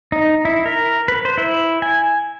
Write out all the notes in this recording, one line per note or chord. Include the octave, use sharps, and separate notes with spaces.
D#4
E4
A#4
B4
C5
E4
G#5